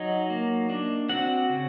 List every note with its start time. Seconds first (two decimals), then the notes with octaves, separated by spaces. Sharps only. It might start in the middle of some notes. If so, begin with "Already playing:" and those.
Already playing: F#3 D#4 D#5
0.30 A#3
0.70 D4
1.09 C4 F#4 F#5
1.49 C#3